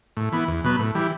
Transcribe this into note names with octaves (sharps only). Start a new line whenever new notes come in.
A2
E3 B3
E2
B2 F#3 B3
A2
E3 G3